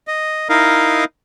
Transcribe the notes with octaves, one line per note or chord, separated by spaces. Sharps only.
D#5
D#4 E4 A#4 D#5 F5